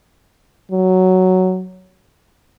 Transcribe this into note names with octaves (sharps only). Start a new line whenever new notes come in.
F#3